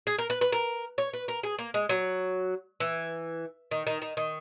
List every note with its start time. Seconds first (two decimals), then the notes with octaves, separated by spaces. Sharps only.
0.07 G#4
0.19 A#4
0.30 B4
0.41 B4
0.52 A#4
0.98 C#5
1.13 B4
1.28 A#4
1.43 G#4
1.59 A#3
1.74 G#3
1.89 F#3
2.80 E3
3.71 D#3
3.87 D#3
4.02 D#3
4.17 D#3